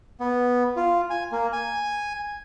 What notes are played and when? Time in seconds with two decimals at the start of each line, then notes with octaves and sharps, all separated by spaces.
0.20 B3
0.76 F4
1.10 G#5
1.32 A#3
1.53 G#5